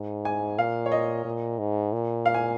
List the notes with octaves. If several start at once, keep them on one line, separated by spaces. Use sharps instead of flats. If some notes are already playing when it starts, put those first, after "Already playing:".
Already playing: G#2
G#5
A#2 F5
C#5
D#5
A#2
G#2
A#2
F5
G#5